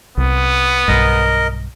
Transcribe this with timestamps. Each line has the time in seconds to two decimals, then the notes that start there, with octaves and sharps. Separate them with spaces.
0.17 C2 B3
0.88 B1 G2 A#4 D#5